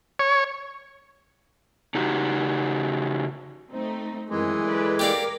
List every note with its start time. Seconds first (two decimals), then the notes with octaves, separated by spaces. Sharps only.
0.19 C#5
1.94 C#3 D#4 F#4 G4
3.70 A3 C4 D#4
4.30 F#2 C3 D#3 E3 G#3
4.67 A4 B4 D5
4.99 G4 A#4 D5 F5 D6